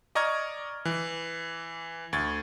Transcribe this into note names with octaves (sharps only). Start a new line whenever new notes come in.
D5 D#5 A#5 C#6 F6 G#6
E3
D2 C#6 G#6 A6